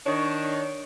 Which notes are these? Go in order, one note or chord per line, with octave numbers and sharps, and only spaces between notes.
D#3 D4 C#5